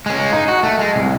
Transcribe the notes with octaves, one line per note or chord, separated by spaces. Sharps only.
G#3 C#4
D#4
F#4
A3
G#3
C2